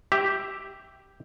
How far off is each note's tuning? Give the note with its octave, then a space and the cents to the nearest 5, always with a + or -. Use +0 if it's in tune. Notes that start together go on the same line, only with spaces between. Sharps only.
G4 +0 E5 +0